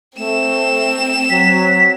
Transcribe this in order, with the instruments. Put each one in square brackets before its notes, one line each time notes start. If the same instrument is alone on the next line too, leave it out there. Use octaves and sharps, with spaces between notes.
[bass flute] A3 [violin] C4 E7
[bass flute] F#3 [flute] B6